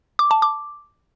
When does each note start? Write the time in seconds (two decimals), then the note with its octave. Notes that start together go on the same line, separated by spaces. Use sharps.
0.19 D6
0.31 A5
0.42 D6